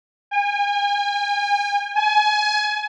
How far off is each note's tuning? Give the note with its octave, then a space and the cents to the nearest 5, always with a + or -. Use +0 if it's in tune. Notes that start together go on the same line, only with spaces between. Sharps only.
G#5 -40
G#5 +25